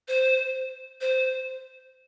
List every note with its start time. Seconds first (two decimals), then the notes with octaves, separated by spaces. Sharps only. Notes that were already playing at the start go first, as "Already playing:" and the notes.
0.08 C5
1.01 C5